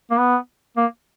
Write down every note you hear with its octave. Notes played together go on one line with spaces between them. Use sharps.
A#3
B3
A#3